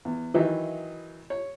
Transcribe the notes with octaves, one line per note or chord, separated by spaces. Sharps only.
E2
D#3 E3 F#3 D#4 E4
C#5